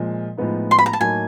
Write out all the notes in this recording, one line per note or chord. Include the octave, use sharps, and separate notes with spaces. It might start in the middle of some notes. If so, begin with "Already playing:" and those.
Already playing: A#2 F3 G#3
A2 F3 G#3 B3 D#4
C6
B5
A#5
A5
A2 F#3 A#3 D#4 G#5